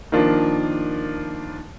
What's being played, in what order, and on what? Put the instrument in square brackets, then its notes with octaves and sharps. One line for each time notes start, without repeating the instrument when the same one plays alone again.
[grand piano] D#3 F3 A#3 D4 F4